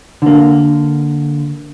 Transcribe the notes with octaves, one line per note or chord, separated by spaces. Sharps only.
D3 A#3